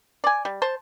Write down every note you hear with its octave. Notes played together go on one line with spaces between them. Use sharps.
D5 G#5
G3
C5 A5